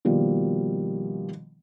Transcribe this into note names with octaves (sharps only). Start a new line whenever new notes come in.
B2 D#3 F3 G3 A#3